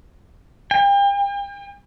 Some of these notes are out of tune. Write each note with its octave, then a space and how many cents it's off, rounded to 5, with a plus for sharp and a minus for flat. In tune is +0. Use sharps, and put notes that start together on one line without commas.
G5 +40